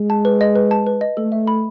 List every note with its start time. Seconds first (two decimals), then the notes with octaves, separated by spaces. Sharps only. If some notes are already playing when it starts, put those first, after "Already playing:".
Already playing: G#3
0.10 A5
0.25 B4
0.41 D#5
0.56 B4
0.71 A5
0.87 B4
1.01 D#5
1.17 A3 A4
1.32 E5
1.47 B5